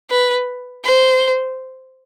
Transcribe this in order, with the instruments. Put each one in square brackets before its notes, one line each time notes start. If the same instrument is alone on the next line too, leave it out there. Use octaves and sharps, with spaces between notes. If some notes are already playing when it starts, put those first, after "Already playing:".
[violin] B4
C5